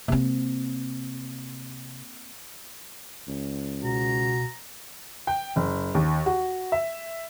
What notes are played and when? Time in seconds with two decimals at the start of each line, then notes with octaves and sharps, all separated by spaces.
0.08 C3 A#3 C4
3.28 C#2
3.83 B2 F#4 A#5
5.27 G5
5.56 F#1
5.95 D#2
6.26 F#4
6.72 E5